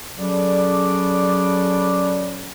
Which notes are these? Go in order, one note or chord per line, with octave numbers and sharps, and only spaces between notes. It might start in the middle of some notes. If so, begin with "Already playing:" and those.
F#3 C#4 G#4 A4 B4 D5